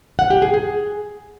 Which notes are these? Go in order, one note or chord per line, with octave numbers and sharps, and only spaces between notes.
F#5
G4
G#4
G#4